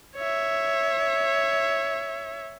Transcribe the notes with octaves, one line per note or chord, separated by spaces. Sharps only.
C#5 E5